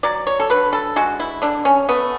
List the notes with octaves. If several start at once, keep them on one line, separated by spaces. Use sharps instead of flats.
F#3 D5
C#5
A4
D3 B4
A4
G#3 F#4
E4
D3 D4
C#4
A3 B3